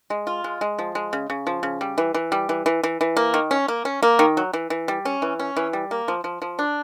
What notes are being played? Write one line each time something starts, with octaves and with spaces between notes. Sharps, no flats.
G#3
F4
G#3
G#3
F3
G#3
C#3
C#3
F3
C#3
G3
E3
E3
G3
E3
E3
E3
E3
A#3
D#3
C#4
A#3
C#4
A#3
D#3
F#3
E3
E3
G3
C#4
E3
C#4
E3
G3
A#3
F3
F3
F3
D4